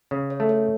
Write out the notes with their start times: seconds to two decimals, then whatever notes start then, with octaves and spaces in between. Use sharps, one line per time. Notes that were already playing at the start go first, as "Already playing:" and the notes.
0.11 C#3 C#5
0.30 C#5
0.40 A3
0.49 C#5